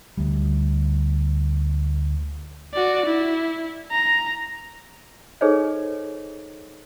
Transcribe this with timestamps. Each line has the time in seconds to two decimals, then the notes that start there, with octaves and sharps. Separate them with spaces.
0.17 D2 G3
2.74 F#4 D5
3.06 E4
3.91 A#5
5.41 D#4 G#4 A4 C5 C#5 D#5